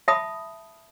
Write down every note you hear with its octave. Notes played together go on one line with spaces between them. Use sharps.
E5 A5 B5 D#6